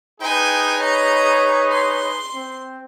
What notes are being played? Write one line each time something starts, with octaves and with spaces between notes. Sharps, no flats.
D#4 G#4 B4 G5 G#5
C#5 D#5 A#5
C6
C4